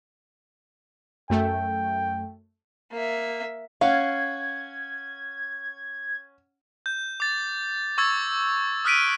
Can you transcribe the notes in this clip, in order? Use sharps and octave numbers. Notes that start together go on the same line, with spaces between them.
F#2 A3 G5
A#3 E5
C#4 F5 F#5 G#6
G6
D6 A6
C#6 E6 G#6 A6
D#6 F6 F#6 B6 D7 D#7